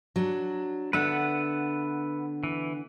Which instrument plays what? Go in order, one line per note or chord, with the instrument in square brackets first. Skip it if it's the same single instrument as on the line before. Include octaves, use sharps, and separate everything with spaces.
[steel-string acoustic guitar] F#3 D4
[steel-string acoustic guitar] D3 B3 D4 [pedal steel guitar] B4 E5 F#5
[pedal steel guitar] E3